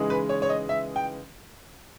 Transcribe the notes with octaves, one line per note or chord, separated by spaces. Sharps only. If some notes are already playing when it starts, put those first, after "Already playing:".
Already playing: C#3 E3 G#3 D#4
B4
C#5
C#5
D#5
E5
G5